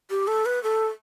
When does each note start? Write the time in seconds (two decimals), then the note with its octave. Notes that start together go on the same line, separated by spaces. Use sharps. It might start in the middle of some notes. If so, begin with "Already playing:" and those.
0.10 G4
0.27 A4
0.46 B4
0.63 A4